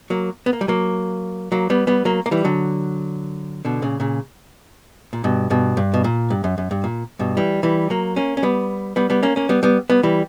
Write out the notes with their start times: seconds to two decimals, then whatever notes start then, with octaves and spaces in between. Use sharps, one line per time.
0.10 F#3 A#3
0.46 B3
0.53 A#3
0.61 G3
0.68 F#3 A#3
1.52 F#3 A#3
1.70 G3 B3
1.87 G3 B3
2.05 F#3 A#3
2.26 A#3
2.31 E3 G3
2.45 D3 F#3
3.65 B2 D3
3.82 A#2 C#3
4.00 A#2 C#3
5.13 A#2
5.24 G2 B2
5.50 G2 B2
5.77 G2
5.94 B2
6.04 A#2
6.30 G2
6.44 F#2
6.58 F#2
6.71 G2
6.84 A#2
7.19 G2 B2
7.37 E3 G3
7.63 E3 G3
7.90 F#3 A#3
8.16 A#3 C#4
8.37 C#4
8.43 G3 B3
8.96 G3 B3
9.10 G3 B3
9.23 A#3 C#4
9.36 A#3 C#4
9.49 G3 B3
9.63 G3 B3
9.90 G3 B3
10.03 E3 G3